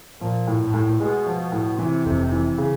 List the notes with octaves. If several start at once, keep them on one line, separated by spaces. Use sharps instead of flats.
A#2 F3
A2
A#2
A2
B2 G#3
F3
A2
C3 E3
F1
E3
C#3